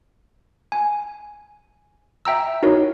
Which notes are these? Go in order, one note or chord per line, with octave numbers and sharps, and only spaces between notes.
G#5
E5 G5 A#5 E6
D#4 E4 F#4 A#4 C#5